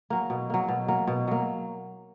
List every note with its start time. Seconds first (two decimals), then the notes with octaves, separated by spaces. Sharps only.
0.10 F#3 A#3
0.30 B2
0.50 F#3 A#3
0.69 B2
0.88 F#3 A#3
1.07 B2
1.28 F#3 A#3